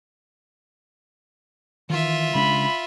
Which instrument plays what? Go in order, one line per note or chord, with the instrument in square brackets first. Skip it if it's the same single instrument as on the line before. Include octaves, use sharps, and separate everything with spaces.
[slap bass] D#3 E3 [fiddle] F4 E5
[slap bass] C#3 G#3 D4 [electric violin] B5